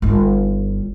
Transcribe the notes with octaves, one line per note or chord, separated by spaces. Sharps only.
G1 D#4